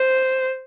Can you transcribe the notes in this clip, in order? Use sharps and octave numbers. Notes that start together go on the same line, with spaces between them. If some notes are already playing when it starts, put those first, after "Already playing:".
Already playing: C5